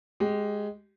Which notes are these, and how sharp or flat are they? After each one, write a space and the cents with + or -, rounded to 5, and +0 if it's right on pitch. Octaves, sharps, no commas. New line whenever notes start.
G#3 +0 G4 -15